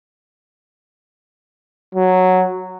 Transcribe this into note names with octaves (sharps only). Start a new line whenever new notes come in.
F#3